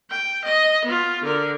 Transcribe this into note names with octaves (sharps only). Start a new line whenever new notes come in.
G5
D#5
B3 F4
D3 A#4